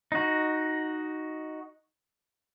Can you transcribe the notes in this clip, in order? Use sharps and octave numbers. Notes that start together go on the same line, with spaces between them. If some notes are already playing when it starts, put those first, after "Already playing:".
D#4 F#4